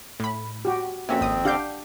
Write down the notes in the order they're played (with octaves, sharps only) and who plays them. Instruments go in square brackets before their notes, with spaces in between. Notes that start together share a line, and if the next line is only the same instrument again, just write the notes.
[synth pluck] A2 B5
[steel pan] F#4 G4
[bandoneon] F2 C4 [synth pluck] A#3 C#4 F#4 [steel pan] E5
[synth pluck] G#1 D#6
[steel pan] D4 G4 F5 [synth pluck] F#5 G6